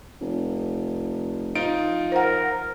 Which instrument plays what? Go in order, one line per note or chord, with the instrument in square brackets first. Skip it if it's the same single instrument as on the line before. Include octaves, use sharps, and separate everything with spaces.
[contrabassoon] F1
[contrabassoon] F3 [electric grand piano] D#4 F4 D7
[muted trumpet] A#4 [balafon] C5 F#5